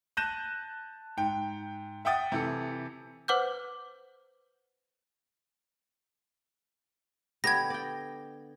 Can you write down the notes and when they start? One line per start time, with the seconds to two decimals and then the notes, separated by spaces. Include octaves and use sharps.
0.17 A5 F#6 G6 A#6 D#7 E7
1.17 G#2 G5
2.05 E5 F#5 G5 D#6 A6
2.32 C3 E3 A4
3.28 B4 C5 F#5 D6 F6 G6
7.44 D3 B3 G4 G#6 A#6
7.70 D5 G5